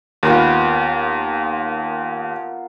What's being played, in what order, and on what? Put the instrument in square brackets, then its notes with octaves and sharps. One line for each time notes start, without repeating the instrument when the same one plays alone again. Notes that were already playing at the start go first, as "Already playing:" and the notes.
[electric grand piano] D#2 [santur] B3 F4 A#4